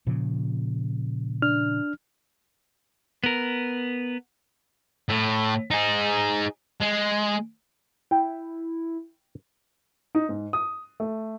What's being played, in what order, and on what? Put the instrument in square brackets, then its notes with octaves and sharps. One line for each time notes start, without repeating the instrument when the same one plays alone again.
[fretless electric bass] A#2 C#3 F3
[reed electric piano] D4 F6
[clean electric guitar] B3 A#4
[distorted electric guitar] A2
D#4 G#4
G#3
[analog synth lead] E4 [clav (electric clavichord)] G5
[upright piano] D#4
G#2
D#6
A3